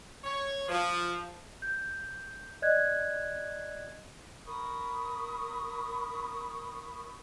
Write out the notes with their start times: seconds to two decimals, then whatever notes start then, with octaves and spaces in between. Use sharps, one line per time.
0.24 C#5
0.69 F3
1.62 G6
2.62 D5 D#5 F#6 G#6
4.46 A#4 B5 C#6 D#6